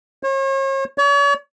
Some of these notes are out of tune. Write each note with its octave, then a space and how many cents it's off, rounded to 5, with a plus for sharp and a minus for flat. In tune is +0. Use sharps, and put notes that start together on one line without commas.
C#5 -40
C#5 +45